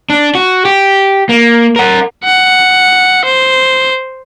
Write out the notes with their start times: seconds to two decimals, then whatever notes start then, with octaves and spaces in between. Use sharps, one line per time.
0.10 D4
0.35 F#4
0.65 G4
1.29 A#3
1.76 A#4 F#5
2.24 F#5
3.25 C5